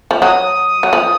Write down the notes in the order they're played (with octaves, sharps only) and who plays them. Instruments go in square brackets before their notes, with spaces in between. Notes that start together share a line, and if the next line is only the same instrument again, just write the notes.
[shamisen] F3
[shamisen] F#3 [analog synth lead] D#6
[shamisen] F#3
F3